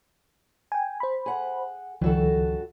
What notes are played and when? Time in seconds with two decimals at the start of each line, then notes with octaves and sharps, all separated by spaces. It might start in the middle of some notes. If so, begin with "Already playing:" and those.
0.72 G5 G#5
1.00 C5 B5
1.26 G#4 F#5
2.01 C#2 G2 D#3 F3 F#4 A4